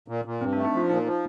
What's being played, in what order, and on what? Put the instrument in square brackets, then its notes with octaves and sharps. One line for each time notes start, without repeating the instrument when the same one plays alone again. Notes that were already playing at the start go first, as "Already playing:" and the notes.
[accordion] A#2
A#2
[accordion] G2 [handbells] C4
[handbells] D4
[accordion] A3
[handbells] D#4
[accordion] F3 [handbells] F4
[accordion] A#2 [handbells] D#4
[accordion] F3